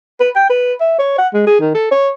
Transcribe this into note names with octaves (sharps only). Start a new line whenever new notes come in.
B4
G5
B4
E5
C#5
F#5
G#3
G#4
D#3
A4
C#5